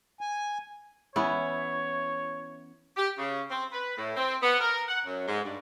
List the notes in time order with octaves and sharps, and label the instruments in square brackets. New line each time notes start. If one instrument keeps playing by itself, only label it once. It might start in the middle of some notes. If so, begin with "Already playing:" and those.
[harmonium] G#5
[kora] E3 B3 C#4 [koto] E4 [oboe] C#5
[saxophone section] G4
C#3
C4
B4
A2
C4
B3
A#4
F#5
F#2
G#2
G2